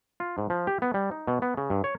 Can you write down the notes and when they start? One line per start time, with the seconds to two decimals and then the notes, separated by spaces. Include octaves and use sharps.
0.20 F4
0.38 G#2
0.50 F3
0.67 G4
0.82 B3
0.94 G3
1.11 D#4
1.27 B2
1.42 B3
1.57 C#3
1.70 G2
1.84 C#5